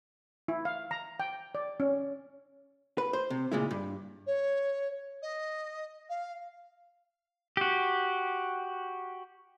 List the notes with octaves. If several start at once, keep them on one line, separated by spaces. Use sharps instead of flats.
E4
F5
A#5
G5
D5
C#4
B4
C5
C3
A#2 C#3 G#3 E4
G2
C#5
D#5
F5
F#4 G4